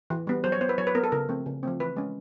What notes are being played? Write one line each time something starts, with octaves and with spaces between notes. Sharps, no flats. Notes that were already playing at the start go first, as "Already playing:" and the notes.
E3
G3 B3
F#3 C5
C#5
B3 C5
B4
F#3 C#5
B4
B3 A#4
A4
C#3 A#4
F3 A3 C4
C#3
F3 A3 C4
E3 B4
G#3 C#4